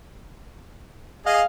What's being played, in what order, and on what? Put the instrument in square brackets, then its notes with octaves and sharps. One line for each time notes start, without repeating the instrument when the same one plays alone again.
[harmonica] G#4 D#5 [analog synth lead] F5